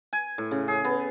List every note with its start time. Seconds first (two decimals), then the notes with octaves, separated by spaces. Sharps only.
0.13 G#5
0.38 A2
0.51 C#3
0.68 G#4
0.84 B3